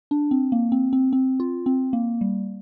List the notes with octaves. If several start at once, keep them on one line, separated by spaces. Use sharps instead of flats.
D4
C4
A#3
C4
C4
C4
F4
C4
A#3
G3